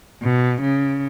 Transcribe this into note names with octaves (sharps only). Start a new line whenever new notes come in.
B2
C#3